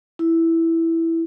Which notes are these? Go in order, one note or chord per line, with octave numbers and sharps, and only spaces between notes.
E4